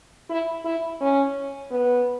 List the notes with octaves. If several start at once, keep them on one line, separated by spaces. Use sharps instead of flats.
E4
E4
C#4
B3